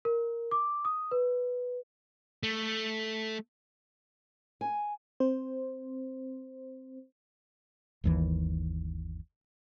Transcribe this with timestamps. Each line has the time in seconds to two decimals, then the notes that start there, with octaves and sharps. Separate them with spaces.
0.05 A#4
0.51 D6
0.85 D#6
1.11 B4
2.43 A3
4.61 G#5
5.20 C4 C5
8.04 G1 D#2 E3